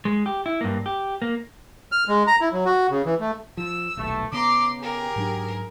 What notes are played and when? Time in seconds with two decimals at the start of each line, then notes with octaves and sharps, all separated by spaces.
0.05 G#3
0.26 G4
0.46 E4
0.61 G2 A#3
0.86 G4
1.22 A#3
1.92 F6
2.08 G#3
2.27 A#5
2.41 E4
2.53 F#3
2.65 F#4
2.90 C#3
3.05 E3
3.20 A3
3.57 F3 E6
3.97 D#1 B1 A3
4.32 C#3 B3 A#5 C6 D6
4.80 G4 G#4 A#4
5.16 G#2 F#3 D4